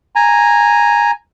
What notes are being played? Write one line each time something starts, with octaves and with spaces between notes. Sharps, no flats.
G#5 A#5